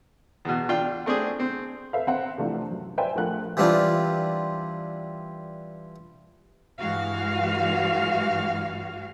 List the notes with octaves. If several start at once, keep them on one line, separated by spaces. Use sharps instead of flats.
E2 B2
D4 F4 G5
A3 C4 D4 G#4
C4
A4 B4 E5 F5
C4 F#5
C3 E3 F3 A3 D4
F#2
B4 C5 D5 E5 G5 G#5
A#1 F3 A3 A#4 F#5 F#6
E3 G3 C4 D4 F4
G2 E3 G#3 F#4 F5